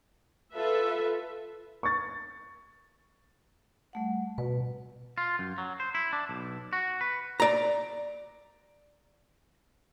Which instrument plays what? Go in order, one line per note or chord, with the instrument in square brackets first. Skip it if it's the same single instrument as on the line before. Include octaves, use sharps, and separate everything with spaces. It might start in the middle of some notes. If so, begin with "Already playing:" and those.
[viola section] F4 A4 B4 E5
[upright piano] C#6 A6
[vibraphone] G3 A3 F#5
[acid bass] B2 [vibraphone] B4
[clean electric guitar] F4
F#2
F#3
C5
E4
D4
B1
F#4
B4
[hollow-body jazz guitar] D5 A#5